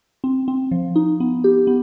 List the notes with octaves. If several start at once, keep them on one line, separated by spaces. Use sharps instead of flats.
C4
C4
F3
D#4
B3
G4
B3